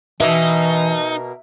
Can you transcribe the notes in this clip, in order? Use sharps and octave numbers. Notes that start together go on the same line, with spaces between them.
B2 E3 A#3 D#4 E5